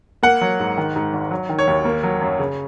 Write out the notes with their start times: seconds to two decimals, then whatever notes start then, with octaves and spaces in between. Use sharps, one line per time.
0.23 A#3 F#5
0.41 F#3
0.60 G#2
0.77 D#3
0.96 G#2
1.13 G#1
1.31 F#3
1.49 D#3
1.58 C#5
1.67 D#2
1.85 A#3
2.03 F#3
2.21 F#2
2.39 C#3